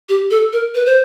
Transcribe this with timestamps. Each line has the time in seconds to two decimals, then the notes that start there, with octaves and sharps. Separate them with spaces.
0.09 G4
0.31 A4
0.53 A#4
0.74 B4
0.86 C5